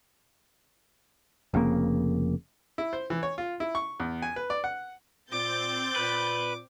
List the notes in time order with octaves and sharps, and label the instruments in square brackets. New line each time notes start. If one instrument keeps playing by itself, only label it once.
[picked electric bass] F1 F2 C#3 A#3
[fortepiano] E4
C5
E3
C#5
F4
E4
C#6
E2
G#5
B4
D5
F#5
[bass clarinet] A#2 [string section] C4 G6 A6 [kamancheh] D6
[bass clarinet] A#2 [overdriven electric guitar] B4